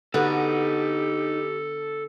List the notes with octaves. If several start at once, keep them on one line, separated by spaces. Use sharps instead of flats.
D3 B3 D#4 F#4 G4 A4 B4